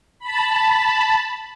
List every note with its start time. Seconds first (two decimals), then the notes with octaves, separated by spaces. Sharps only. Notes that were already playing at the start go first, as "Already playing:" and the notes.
0.19 A5 B5